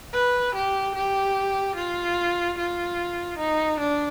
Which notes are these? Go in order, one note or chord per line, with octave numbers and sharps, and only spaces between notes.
B4
G4
G4
F4
F4
D#4
D4